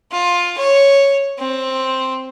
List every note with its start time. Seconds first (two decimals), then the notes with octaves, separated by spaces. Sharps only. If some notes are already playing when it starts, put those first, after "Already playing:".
0.12 F4
0.58 C#5
1.39 C4